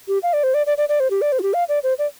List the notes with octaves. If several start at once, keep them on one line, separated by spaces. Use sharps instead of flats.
G4
F5
D5
C5
D5
D5
D5
D5
C5
G4
D5
C5
F4
G4
F5
D5
C5
D5